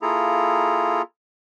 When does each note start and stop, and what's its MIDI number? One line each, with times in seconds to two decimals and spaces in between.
0.02 1.02 58
0.02 1.02 64
0.02 1.02 65
0.02 1.02 68
0.02 1.02 69
0.02 1.02 82